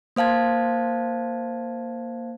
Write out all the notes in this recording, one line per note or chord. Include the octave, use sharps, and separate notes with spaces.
A#3 C5 F5 A5 G#6